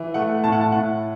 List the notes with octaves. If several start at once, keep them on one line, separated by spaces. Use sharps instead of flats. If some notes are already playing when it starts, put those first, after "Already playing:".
Already playing: E3
A3 F#5
A2 A5
F#5
A5
A2 F#5